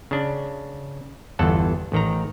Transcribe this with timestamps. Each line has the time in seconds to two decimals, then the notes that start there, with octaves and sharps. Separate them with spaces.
0.11 C#3 D4
1.39 G1 E2 A4 F#5 A5
1.92 A1 D#3 A#5